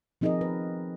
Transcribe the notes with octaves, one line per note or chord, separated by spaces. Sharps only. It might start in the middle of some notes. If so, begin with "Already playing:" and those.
F3 C4 D#4 G#4 A#4 D#5
B4